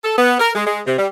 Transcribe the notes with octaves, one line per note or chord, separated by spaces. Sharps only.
A4
B3
A#4
G#3
G#3
C3
G3